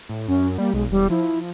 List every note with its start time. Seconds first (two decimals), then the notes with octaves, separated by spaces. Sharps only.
0.09 A2
0.28 F#2 C#4
0.58 G3 A#3
0.74 B1 G#3
0.91 E1 G3
1.10 F3 E4